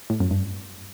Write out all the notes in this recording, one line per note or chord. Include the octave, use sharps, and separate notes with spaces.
A2
F#2
G2